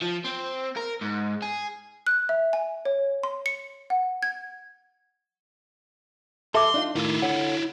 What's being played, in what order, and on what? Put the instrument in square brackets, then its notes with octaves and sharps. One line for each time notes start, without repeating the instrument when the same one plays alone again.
[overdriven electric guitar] F3
C4
A#4
G#2
G#4
[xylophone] F#6
E5
G#5
C#5
C6
C#7
F#5
G#6
[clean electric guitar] A4 [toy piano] E5 D6 [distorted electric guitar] C6
[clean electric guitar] D4 D#4 F4
[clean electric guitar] A2 D#3 [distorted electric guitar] E4 F4
[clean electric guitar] D3 C#5 F#5